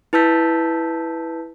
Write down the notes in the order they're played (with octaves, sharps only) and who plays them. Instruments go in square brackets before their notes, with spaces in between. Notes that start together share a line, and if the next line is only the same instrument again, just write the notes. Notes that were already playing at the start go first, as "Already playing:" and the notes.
[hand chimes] E4 B4 A5 E6 G6 B6